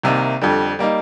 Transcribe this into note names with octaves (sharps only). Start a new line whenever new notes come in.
C2 C3 D#3 A#3
F2 D3 G3
G3 A#3 D#4